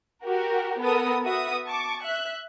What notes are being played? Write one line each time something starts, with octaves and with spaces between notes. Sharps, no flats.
F#4 G4 A#4
B3 A4 A#4 D#6
B3 F#4 E5 D#6
A5 C#6 D6
E5 F#6